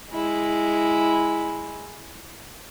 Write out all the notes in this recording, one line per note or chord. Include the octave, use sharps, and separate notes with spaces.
G#3 E4